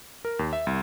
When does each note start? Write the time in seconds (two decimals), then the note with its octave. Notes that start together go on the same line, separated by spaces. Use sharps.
0.25 A#4
0.39 D#2
0.53 E5
0.67 C2